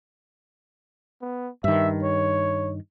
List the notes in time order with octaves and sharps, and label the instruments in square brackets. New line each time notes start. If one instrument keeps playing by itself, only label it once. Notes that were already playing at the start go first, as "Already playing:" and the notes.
[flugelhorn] B3
[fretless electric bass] G2 D#3 [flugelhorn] E5
[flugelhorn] C#5